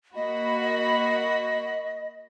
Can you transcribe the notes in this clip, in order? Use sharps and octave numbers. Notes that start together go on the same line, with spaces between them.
A#3 F#4 D#5 B5